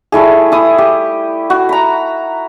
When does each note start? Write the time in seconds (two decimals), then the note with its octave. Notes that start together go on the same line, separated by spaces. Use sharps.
0.12 G3 A3 E4 G#4
0.52 E4 D#6
0.78 G4
1.50 F#4
1.69 A#5 B5